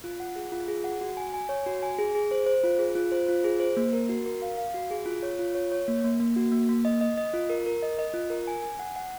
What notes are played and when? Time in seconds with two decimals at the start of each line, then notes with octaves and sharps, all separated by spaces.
0.04 F4
0.20 F#5
0.36 G#4
0.52 F4
0.68 G#4
0.84 F#5
1.01 F#4
1.17 G#5
1.34 G#5
1.49 C#5
1.66 F#4
1.83 G#5
1.98 G#4
2.15 G#4
2.31 C5
2.46 C5
2.64 F4
2.79 G#4
2.95 F4
3.12 C5
3.29 F4
3.44 G#4
3.60 C5
3.77 A#3
3.93 A#4
4.09 F#4
4.26 A#4
4.42 F5
4.58 F5
4.74 F#4
4.90 G#4
5.06 F4
5.23 C#5
5.39 F4
5.55 C#5
5.72 C#5
5.88 A#3
6.04 A#3
6.20 A#3
6.36 F#4
6.52 A#3
6.69 A#3
6.85 D#5
7.01 D#5
7.17 D#5
7.34 F4
7.50 A#4
7.66 A#4
7.83 D#5
7.99 D#5
8.14 F4
8.30 A#4
8.47 G#5
8.62 G#5
8.79 F#5
8.96 F#5